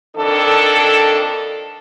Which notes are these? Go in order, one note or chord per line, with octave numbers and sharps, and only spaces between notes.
F2 D#3 D4 A4